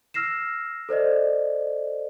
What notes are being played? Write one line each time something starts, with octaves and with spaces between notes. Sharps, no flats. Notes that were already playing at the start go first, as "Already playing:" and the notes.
E6 F6 A#6 C7 E7
A4 C5 D5 D#5